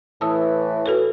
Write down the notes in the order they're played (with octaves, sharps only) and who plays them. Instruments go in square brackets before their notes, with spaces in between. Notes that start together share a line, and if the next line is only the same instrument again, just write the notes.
[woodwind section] A2 E3 [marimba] A5 D#6 E6
[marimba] F#4 A4 B4